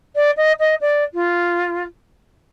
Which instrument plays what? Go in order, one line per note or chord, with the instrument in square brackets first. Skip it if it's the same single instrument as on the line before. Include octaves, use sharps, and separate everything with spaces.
[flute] D5
D#5
D#5
D5
F4